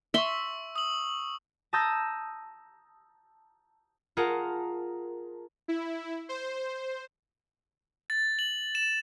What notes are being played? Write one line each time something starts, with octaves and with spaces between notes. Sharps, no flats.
E5 C6 C#6 E6
D#6 F#7
A5 A#5 D#6 E6 G6 A#6
F4 G#4 A#4 F#5 A5 A#5
E4
C5
A6
F#7
E7